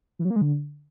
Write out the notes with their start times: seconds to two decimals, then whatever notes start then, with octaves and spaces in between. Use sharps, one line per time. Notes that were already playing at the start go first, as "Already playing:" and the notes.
0.19 E3
0.25 F#3
0.30 A#3
0.36 G#3
0.41 D3